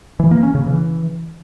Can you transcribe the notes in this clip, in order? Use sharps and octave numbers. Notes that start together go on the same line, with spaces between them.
E3
A#3
C#4
C#3
E3